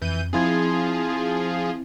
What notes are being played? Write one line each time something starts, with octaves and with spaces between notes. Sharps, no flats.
F2 E3 G6 D#7
F3 C4 E4 F4 G#4 G#6